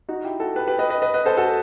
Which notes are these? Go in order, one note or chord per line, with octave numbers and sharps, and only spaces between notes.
D#4 F#4
E4 G4
F#4 A4
G4 B4
G4 B4
B4 D#5
B4 D#5
B4 D#5
B4 D#5
A4 C5
F#4 A4